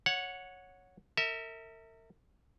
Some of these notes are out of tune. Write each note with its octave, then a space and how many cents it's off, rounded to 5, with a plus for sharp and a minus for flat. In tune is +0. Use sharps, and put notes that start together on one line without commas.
C#5 +0 F#5 -15
A#4 -40 E5 -25